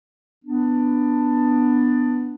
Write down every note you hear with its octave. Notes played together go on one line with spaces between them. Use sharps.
B3 D4